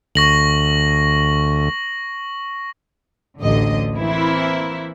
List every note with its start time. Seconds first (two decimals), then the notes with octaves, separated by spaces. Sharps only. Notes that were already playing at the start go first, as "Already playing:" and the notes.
0.15 D2 C#6 A#6 F#7
3.40 A1 D2 D3 D#5
3.95 E3 A#3 C4 E4